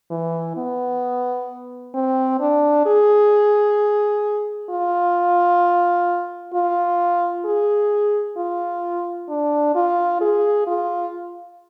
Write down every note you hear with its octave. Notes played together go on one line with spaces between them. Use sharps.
E3
B3
C4
D4
G#4
F4
F4
G#4
F4
D4
F4
G#4
F4